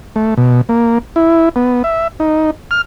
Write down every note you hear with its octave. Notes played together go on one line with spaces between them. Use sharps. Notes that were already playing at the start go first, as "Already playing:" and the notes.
A3
B2
A#3
E4
B3
E5
D#4
F6